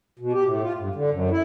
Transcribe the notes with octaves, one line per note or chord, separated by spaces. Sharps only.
B2
G4
A2
F4
G2
D3
F#2
E4